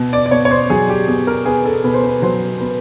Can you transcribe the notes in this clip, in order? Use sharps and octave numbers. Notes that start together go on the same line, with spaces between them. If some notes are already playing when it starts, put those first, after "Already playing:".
Already playing: B2
D5
D5
B2 C#5
C#5
C5
F#3 G#4
G4
B2 G#4
A#4
B3 G#4
A4
B2 B4
C5
B4
F#3 C5
B2 B4